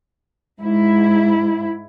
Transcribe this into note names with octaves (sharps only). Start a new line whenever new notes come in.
G#2 E4